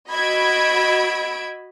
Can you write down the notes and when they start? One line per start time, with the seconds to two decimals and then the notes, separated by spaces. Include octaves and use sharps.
0.10 F#4 D#5 B5 E6 G#6 D7